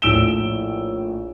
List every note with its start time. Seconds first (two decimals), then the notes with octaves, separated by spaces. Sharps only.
0.02 A#1 A2 E6 D7 E7 G7